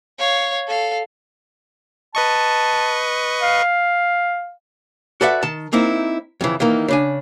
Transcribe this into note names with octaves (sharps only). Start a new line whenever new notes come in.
C#5 F5
A4 F5
B4 D#5 A5 C#6
F5
F#4 A4 B4 D5 E5 F#5
D#3 A5
A#3 C4 D#4 E4
F2 C#3 E3
D#3 E3 A#3 D#4
C#3 D4 G#5